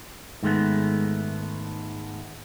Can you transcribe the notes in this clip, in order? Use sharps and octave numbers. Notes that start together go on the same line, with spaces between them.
G#2 D#3 G#3 A3 B3